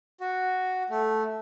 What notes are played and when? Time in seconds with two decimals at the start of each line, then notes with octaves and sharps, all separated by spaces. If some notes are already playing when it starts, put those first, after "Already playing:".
0.20 F#4
0.90 A3